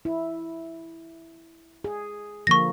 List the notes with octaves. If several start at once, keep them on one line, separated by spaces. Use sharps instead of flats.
E4
G#4
D3 F3 A#3 C#6 A#6